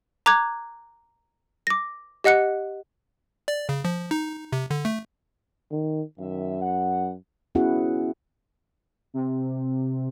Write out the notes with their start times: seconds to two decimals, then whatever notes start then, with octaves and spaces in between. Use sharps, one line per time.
0.26 A#5 D6 F#6 G#6
1.67 D6 A#6
2.24 G4 D#5 F#5 F#6 C#7
3.48 D5
3.69 C#3
3.85 F3
4.11 D#4
4.52 C3
4.70 D3
4.85 A3
5.71 D#3
6.19 F#2 D#3 E5
6.61 F#5
7.55 B3 C#4 E4 F#4 G#4 F#5
9.14 C3